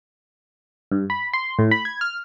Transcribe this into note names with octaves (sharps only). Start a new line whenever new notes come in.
G2
B5
C6
A2
B5
G#6
F6